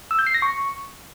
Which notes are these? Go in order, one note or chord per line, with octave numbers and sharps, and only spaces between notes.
E6
G6
C7
A#6
C#6